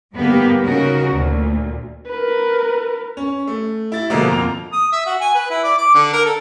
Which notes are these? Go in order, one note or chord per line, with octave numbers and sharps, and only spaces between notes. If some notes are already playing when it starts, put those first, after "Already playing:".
G#2 D3 G3 A#3 B3 G4
C#3 C#4 D#4 F#4 A#4
D2 A#2
A#4 B4
C#4
A3
E4 A6
B2 D3 F3 G#3 A#3
F2 A#3 F7
D#6
E5
F#4
G#5
B4
E4
D5
D6
D3
A#4
A4